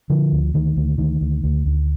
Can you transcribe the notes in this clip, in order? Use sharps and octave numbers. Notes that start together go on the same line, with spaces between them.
D3 F3
D2
D2 D#3
D2
D2 D#3
D2
D2
D2